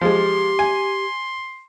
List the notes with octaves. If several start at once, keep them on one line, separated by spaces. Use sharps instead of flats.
F3 G#3 G4 C6
G#5